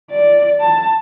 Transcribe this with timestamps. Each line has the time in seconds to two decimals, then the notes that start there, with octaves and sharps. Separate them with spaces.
0.10 D5
0.60 A5